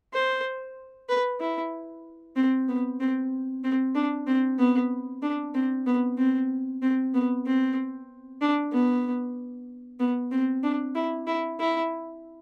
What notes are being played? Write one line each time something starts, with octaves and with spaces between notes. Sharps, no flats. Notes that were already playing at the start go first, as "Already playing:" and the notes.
C5
B4
E4
C4
B3
C4
C4
D4
C4
B3
D4
C4
B3
C4
C4
B3
C4
D4
B3
B3
C4
D4
E4
E4
E4